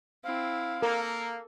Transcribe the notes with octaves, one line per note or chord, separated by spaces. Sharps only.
C4 E4 F5
A#3 A4 A#4